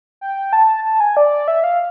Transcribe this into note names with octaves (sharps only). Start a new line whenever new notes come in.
G5
A5
A5
G#5
D5
E5
F5